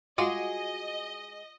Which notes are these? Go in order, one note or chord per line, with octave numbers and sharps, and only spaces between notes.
G#3 F4 F#4 G#4 D#5 F5